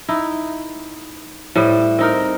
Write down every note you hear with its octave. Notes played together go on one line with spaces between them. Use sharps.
D#4 E4
A2 G3 C5
C4 D#4 A#4